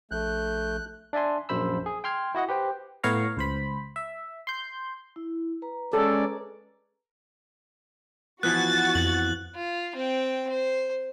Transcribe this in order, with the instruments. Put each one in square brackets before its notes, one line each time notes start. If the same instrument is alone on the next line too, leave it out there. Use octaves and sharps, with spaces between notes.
[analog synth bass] A#1 [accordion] A3 G6 [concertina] F#6
[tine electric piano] D4 D5 E5 G#5 C6
A#1 F#2 C5 B5 E6
G#4
G5 C6 F6 G#6
E4 F#4 D#5 F#5
G4 B4 C5 G5
[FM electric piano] A2 B3 C#5 F5 A#5
C#2 C5 B5
E5
C6 G6
[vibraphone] E4
B4 A#5
[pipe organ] G#3 C#4 D5 [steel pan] A4
[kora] E3 F3 B3 [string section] F#4 A6 [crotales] F#6
[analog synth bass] F2 [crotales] F#7
[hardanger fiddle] F4
C4 G5
C5